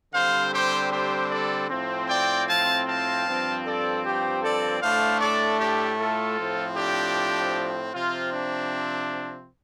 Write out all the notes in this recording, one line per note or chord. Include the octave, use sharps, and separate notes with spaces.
D3 G3 C4 C5 F5
G4 C5
G4 C5
A4 D5
A2 F3 C4
D5 G5
F5 A5
F5 A5
G2 F3 C4
A4 D5
G4 C5
A4 D5
A2 A3 D4 C5 F5
A4 D5
D4 G4
F4 A4
A2 F3 C4
D4 G4
C3 F3 C4 F4
D4